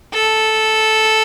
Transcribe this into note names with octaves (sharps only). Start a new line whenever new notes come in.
A4